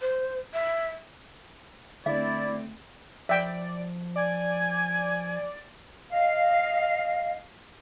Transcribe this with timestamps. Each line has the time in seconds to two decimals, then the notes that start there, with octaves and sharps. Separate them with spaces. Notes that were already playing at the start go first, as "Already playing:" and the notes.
0.01 C5
0.54 E5
2.06 D3 A3 C4 E4 D5 E5
3.29 F3 D5 E5 G5
4.16 D5 G#5
6.10 D#5 F5